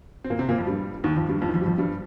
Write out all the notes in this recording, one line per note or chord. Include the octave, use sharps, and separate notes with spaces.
C4
A#2 A#3
C3 C4
A#2 A#3
F2 F3
G2 G3
D#2 D#3
F2 F3
G2 G3
F2 F3
D#3
F2 F3
G3
F2 F3
G2 G3